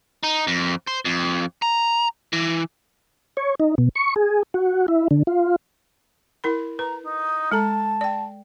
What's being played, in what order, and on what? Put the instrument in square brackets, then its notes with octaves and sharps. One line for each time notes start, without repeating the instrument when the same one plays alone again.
[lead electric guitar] D#4
F2
C5
F2
A#5
E3
[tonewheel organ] C#5
D#4
B2
C#6
G#4
F#4
E4
D3
F4
[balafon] E4 A#4 B5
[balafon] B4 [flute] A#5
[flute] D#4
[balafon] G#3 A4 A#5 [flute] A5
[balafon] D5 G5